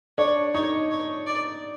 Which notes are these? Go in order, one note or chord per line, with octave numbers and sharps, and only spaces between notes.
D4 C#5
D#4 C#5
C#5
D5